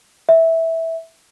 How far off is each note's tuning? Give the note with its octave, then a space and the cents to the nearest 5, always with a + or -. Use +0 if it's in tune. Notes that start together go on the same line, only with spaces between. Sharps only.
E5 -10